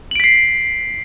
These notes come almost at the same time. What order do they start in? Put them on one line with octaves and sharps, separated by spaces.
F#7 D7 B6 C7